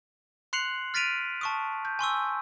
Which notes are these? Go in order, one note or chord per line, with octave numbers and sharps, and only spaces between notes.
C6 F#6 C7 C#7 F7 F#7
F6 A6 B6 D7 D#7 F7
A5 C#6 D#6
G6
G#5 C6 C#6 E6